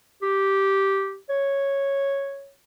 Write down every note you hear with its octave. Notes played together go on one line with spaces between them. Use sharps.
G4
C#5